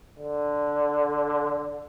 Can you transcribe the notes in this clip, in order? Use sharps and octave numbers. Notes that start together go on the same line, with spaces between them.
D3